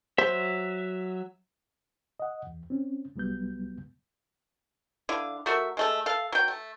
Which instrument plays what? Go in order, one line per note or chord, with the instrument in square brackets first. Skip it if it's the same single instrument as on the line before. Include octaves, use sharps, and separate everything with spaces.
[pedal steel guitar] F#3 E5 [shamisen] C5
[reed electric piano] D#5 F#5
E2
C4 C#4
C2 F#3 G3 B3 G6
[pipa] D3 E4 F5
A3 F#4 A#4 E5
G#3 A3 A4
A4 F5
F#3 G5
A3